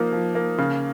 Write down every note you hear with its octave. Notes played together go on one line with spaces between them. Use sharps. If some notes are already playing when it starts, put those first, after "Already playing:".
Already playing: F3 A#3 D#4
F3
A#3
C#3